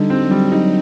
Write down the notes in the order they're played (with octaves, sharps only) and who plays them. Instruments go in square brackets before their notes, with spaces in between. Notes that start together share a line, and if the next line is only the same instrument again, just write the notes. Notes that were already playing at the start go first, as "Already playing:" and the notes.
Already playing: [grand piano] D3 D#4 [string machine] G3
[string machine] F#3 [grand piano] C4
[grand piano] G3
D#4